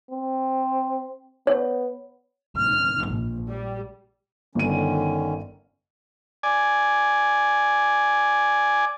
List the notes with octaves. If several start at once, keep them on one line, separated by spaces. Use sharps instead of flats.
C4
B3 C#5
F6
A#1
G3
G1 D3 D#3 C#4 D#7
D5 G#5